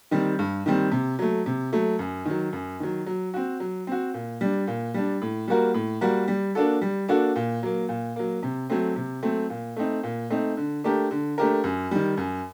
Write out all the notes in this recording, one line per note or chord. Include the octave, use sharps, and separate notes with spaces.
D#3 G3 C4
G2
D#3 G3 C4
C3
F#3 A3
C3
F#3 A3
F#2
D#3 F#3
F#2
D#3 F#3
F#3
C4 F#4
F#3
C4 F#4
A#2
G3 D4
A#2
G3 D4
A2
G3 A#3 F#4 A#4
A2
G3 A#3 F#4 A#4
G3
A#3 D4 F#4 A4
G3
A#3 D4 F#4 A4
A#2
F#3 A#3
A#2
F#3 A#3
C3
F#3 A3 C4
C3
F#3 A3 C4
A#2
A3 C4 D#4
A#2
A3 C4 D#4
D3
A3 D4 G4 A#4
D3
A3 D4 G4 A#4
F#2
D#3 G3
F#2